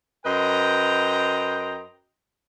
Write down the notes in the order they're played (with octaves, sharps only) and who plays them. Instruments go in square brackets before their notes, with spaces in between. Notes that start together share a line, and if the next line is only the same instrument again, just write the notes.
[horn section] F#2 B4 C5 D#5 G5 A#5